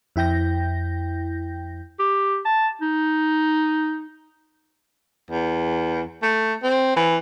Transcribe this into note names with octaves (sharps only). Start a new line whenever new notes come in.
F2 E4 G5 G6 A#6
G4
A5
D#4
E2
A3
C4
E3